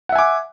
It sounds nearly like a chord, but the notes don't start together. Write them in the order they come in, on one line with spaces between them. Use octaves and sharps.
F#5 E5 G#5 D6